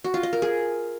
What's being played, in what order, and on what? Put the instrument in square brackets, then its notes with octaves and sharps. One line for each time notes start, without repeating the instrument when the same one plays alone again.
[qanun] F#4
F4
D#5
A#4
G#4